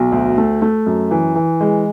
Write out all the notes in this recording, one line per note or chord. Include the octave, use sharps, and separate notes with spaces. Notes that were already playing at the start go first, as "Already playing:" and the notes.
Already playing: B1
D2
A3
A3
F#2
E3
E3
G#3